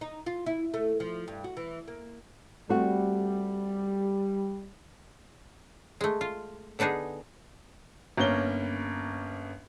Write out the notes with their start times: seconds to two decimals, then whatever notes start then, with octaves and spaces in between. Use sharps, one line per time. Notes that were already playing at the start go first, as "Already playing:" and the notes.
0.01 D#4
0.26 F4
0.46 E4
0.74 A3
1.00 F3
1.28 G2
1.44 F#4
1.57 E3
1.88 A#3
2.69 G3 A3 C4 F#4
6.01 G#3 A3
6.21 F4
6.79 D3 B3 D4 D#4 G#4
8.17 G1 A#3 C#4 G7